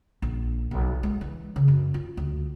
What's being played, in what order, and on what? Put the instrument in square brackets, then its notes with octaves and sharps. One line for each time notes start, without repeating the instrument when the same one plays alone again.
[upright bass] A#1
B1
G#3
E3
C#3
F#2
F4
D2